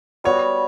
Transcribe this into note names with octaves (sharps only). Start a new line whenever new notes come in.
G3 B3 F#4 C#5